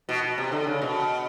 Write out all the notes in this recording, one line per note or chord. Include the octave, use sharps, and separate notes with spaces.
B2
B2
C3
D3
C#3
B2